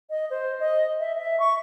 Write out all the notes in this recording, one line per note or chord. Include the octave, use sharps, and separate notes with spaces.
D#5
C5
D#5
E5
E5
C#6